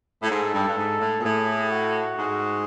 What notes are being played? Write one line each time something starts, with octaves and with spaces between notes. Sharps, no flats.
A2
G#2 A4
G2
G2
G#2
A2
A#2
A2 G#4
F#4
G#2